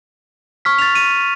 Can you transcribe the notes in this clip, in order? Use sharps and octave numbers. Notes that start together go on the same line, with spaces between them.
C#6 F6 B6
A6 F7
D#7